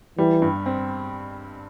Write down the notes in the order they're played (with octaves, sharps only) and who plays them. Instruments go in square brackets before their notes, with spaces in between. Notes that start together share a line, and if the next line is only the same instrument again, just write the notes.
[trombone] E3 [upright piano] G3
[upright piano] G2
C4